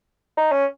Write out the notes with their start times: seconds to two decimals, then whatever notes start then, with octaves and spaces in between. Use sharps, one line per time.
0.37 D#4
0.52 C#4